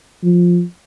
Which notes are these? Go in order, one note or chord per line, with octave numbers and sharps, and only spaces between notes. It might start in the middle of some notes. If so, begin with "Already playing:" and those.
F3